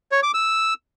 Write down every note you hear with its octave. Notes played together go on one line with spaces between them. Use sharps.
C#5
D6
E6